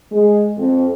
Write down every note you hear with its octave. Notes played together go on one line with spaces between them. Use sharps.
G#3
F2